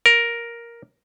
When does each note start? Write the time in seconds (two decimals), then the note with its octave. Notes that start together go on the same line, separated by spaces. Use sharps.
0.06 A#4